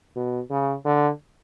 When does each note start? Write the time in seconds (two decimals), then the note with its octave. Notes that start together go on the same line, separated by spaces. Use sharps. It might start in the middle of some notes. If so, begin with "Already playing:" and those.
0.16 B2
0.50 C#3
0.85 D3